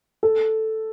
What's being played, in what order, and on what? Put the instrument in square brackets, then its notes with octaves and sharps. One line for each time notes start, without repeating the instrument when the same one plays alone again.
[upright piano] A4